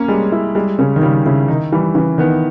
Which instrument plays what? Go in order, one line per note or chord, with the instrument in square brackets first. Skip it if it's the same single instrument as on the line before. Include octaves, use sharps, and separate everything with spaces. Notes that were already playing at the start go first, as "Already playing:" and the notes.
Already playing: [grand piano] A#3 [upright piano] C#4
[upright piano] G3 [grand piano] G#3
[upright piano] E4
[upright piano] G3 [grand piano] G#3
[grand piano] C#3 [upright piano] C#4
[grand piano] D#3
[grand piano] C#3 [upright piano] G3
[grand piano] C#3 [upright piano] E4
[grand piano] D#3 [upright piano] D#4
[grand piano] E3 [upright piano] G3
[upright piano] C#3 [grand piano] E3
[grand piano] D#3 [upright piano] B3